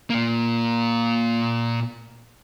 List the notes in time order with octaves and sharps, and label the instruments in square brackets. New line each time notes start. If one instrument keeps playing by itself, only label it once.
[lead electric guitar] A#2 A#3